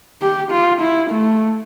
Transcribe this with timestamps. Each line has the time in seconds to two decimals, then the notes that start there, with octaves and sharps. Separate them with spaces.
0.22 G4
0.51 F4
0.81 E4
1.11 A3